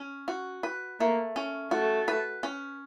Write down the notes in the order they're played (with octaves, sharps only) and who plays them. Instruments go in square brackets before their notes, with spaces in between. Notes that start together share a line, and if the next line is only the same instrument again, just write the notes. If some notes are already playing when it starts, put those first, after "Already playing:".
Already playing: [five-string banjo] C#4
F#4
B4
[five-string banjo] A3 [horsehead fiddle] A#3
[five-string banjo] C#4
[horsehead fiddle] A3 [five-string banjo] F#4
[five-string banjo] B4
C#4